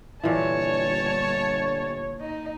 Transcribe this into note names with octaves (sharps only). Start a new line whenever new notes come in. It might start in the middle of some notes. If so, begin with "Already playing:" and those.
G1 A#2 E3 C#5 A5
D#4